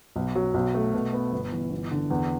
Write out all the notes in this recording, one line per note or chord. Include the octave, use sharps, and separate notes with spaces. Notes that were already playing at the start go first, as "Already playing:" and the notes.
B1
F#3
B1
A3
B2
B3
G1
E3
G1
D3
E2